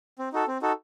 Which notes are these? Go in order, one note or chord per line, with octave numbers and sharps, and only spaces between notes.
C4
D#4 F#4 A4
C4
D#4 F#4 A4